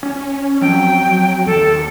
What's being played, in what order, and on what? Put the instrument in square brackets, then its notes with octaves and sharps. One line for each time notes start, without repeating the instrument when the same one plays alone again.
[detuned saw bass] C#4
[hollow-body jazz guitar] F2 [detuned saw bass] F#3 [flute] G5
[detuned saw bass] D#2 [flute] A4